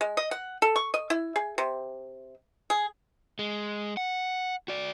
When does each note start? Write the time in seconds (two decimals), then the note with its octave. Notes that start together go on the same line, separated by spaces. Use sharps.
0.01 G#3
0.17 D#5
0.31 F#5
0.62 A4
0.76 C#6
0.94 D#5
1.10 E4
1.36 G#4
1.58 C3
2.70 G#4
3.39 G#3
3.97 F#5
4.68 F#4 D5